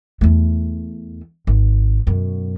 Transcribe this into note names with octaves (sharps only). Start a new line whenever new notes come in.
E2 A3
G#1
F#2 B2